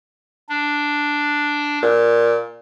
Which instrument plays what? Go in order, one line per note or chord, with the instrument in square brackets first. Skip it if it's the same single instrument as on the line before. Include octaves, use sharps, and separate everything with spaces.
[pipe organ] D4
[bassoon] A#2